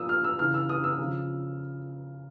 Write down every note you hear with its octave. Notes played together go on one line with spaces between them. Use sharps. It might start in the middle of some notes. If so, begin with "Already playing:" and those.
Already playing: A#2 F3 D#6 E6
F6
E6
C#3 E3 F6
E6
D#6
E6
C#3 F3